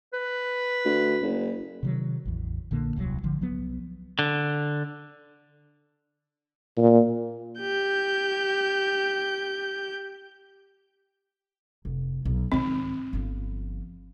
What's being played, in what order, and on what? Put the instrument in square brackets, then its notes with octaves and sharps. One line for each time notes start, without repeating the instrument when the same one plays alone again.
[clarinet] B4
[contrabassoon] D2
F#1
[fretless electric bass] C3 D#3 F#3
A1 E2
A#1 A#2 D3 A#3
D#1 C2 A#2 F#3
G#1 D3 F3
C2 F3 F#3 B3
[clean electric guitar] D3
[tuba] A#2
[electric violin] G4 G6
[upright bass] F1
B1
[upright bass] G#2 D#3 [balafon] C4
[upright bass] G1 F3